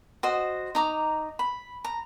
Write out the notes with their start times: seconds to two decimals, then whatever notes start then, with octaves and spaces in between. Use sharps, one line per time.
0.23 F#4 C5 D#5
0.75 D#4 A#5 D6
1.39 B5
1.85 A#5